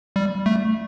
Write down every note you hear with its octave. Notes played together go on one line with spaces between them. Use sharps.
G3
A3